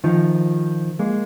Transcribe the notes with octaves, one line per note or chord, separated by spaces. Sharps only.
D#3 F3
G#3 A#3